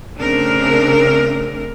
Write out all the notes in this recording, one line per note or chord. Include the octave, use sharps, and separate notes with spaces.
C#3 A3 C4 D4 A#4